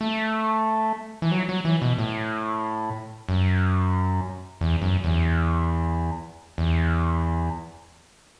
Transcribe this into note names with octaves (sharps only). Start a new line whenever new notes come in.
A3
E3
F#3
F#3
E3
B2
A2
F#2
E2
F#2
E2
E2